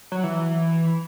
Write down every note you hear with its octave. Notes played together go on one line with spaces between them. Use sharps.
F#3
E3